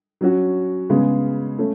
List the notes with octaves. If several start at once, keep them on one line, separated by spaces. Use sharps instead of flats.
F#3 C#4 F#4
C#3 G#3 B3
A3 C#4